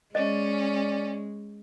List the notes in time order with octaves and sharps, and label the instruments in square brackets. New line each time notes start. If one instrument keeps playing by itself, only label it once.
[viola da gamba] G#3 [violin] C#4 [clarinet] D5 [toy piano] D#5